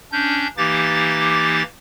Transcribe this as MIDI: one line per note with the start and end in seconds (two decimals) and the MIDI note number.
0.12 0.47 61
0.12 0.47 62
0.12 0.47 91
0.57 1.63 52
0.57 1.63 58
0.57 1.63 63
0.57 1.63 67
0.57 1.63 86
0.57 1.63 93